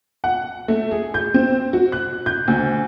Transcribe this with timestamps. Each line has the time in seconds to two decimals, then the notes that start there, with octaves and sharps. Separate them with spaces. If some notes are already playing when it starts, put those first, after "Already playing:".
0.24 F#5
0.68 A3
0.91 G#4
1.14 G6
1.34 C4
1.73 F#4
1.92 F#6
2.26 G6
2.48 D2